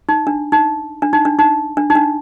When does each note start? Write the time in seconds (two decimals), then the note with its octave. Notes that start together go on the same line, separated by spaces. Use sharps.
0.09 D#4
0.27 D4
0.52 D#4
1.02 D4
1.13 D#4
1.25 D4
1.39 D#4
1.77 D4
1.90 D#4
1.95 D4